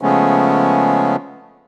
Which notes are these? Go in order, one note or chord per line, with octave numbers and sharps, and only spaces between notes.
C#3 F3 G#3 A3 B3 C#4